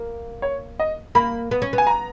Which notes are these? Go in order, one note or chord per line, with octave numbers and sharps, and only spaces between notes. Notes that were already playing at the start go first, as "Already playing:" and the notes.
Already playing: A#3
C#5
D#5
A#3 B5
B3
C#4
B3
G#5
A#5